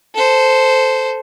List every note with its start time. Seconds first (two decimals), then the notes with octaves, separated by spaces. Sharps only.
0.15 A4 C5